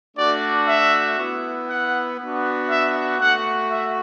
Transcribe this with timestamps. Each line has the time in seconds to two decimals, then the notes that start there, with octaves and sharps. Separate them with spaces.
0.16 A3 D4 F#4 D5
0.67 E5
1.18 B3 E4
1.68 F#5
2.18 B3 D4 F#4
2.68 E5
3.18 A3 F#4 F#5
3.69 E5